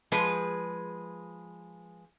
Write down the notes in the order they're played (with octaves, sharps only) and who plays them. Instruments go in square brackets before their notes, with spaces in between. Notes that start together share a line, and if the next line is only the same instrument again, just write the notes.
[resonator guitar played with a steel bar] F3 G#3 G#4 B4